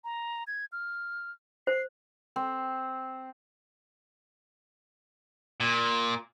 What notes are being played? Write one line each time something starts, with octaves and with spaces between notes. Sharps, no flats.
A#5
G#6
F6
C5 C7
C4
A#2